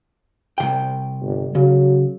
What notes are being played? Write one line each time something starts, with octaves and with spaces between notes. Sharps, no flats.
C2 A#2 G5
G1
C#3 F#3